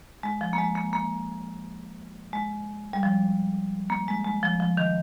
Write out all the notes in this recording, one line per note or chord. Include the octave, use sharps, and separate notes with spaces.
G#3
F3
A#3
G#3
A#3
A#3
G#3
G3
F3
A#3
G#3
G#3
F3
F3
D#3